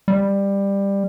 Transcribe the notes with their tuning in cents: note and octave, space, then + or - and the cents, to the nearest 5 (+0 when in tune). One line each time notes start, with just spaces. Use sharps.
G3 +15